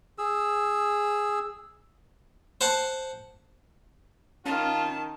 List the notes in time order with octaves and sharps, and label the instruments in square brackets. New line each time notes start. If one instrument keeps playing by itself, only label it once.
[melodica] G#4 E6
[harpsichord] C5 F#5 A5 C6
[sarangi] D#3 [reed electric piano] C#4 [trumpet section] F4 [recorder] A5